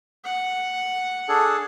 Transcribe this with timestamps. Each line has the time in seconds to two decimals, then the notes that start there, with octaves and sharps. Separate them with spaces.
0.25 F#5
1.29 D4 G#4 A4